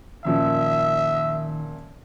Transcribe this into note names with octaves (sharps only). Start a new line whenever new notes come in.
F#2 A#2 D#3 F3 E5